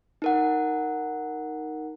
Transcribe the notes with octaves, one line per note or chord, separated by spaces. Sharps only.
D#4 A#4 F#5